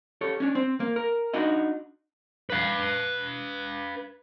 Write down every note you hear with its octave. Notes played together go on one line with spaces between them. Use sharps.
G4 A4 C#5
C#4 D4
C4
A#3
A#4
D4 D#4 F#4 D#5
B4 F5